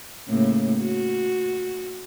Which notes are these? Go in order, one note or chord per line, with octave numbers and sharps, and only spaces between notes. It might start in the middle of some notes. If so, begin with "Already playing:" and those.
A2 C#3 A#3
F#4